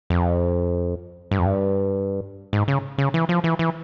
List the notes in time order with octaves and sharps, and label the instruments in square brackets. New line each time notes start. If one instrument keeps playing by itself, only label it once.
[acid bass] F2
G2
F2
G2
G#2
C#3
C#3
E3
F3
E3
E3